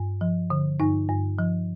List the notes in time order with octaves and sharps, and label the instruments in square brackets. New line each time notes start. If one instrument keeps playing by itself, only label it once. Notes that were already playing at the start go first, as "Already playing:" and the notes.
Already playing: [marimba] G2
F3
D3
G2 D#4
G2
F3